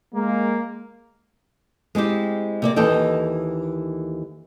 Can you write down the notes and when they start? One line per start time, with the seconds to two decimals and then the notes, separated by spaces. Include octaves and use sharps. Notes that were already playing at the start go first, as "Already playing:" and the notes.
0.15 G#3 A#3
1.95 G#3 C4 E4 G4
2.62 C3 A#3 D5
2.76 D#2 E3 A4 D#5 G5